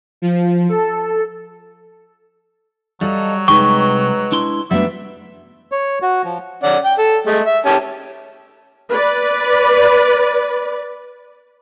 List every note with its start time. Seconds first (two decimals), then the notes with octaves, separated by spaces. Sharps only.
0.22 F3
0.69 A4
3.01 F#3 G3 A4 D#5 F5
3.48 C2 F#2 G#3 D#4 B4 G5 C#6
4.32 D4 E4 C6
4.71 F#3 G3 A3 B3 D4 E5
5.72 C#5
6.02 F#4
6.25 F3
6.64 C#4 D5 F#5
6.85 G5
6.99 A4
7.27 G#3 A3
7.46 E5
7.66 C#4 G4 A5
8.89 B4 D5